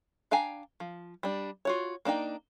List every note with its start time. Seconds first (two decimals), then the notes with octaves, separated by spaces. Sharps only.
0.31 D4 F5 G5 G#5 A#5
0.80 F3
1.23 G3 D4
1.65 F4 F#4 C#5
2.05 A#3 D4 D#4 G5